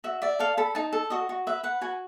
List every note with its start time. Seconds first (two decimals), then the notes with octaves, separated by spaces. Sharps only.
0.04 F#4 E5
0.22 D5 E5
0.39 A4 F5
0.57 A4 B5
0.75 D#4 A5
0.93 A4
1.10 F#4 D#5
1.29 F#4
1.47 B4 E5
1.63 B4 F#5
1.81 F#4 G#5